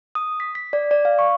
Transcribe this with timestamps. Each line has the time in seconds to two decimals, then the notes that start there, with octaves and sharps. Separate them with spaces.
0.15 D#6
0.40 B6
0.55 B6
0.73 D5
0.91 D5
1.05 F5
1.19 C#6